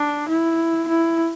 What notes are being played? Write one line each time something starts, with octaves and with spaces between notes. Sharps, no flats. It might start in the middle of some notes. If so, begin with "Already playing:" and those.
Already playing: D4
E4
E4